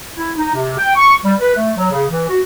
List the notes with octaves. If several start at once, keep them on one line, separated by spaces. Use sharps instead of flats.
E4
D#4
C3
G5
C#6
G3
B4
A3
F#3
C#3
E3
F#4